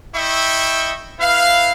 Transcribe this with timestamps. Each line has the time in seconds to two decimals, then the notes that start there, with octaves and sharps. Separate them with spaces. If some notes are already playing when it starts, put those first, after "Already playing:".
0.15 E4 D#5 E5 G5 C#6
1.19 E4 B4 F5